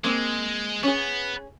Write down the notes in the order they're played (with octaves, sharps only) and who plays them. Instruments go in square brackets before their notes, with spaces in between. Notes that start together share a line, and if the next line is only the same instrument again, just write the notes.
[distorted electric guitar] G#3 [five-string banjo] A#3 C4
[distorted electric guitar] B3 [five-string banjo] C#4 G#4